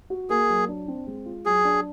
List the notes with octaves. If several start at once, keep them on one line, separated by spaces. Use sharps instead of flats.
F#4
A#3 G#4
F#3
D4
C4
G#3
F4
F#3 G#4
D4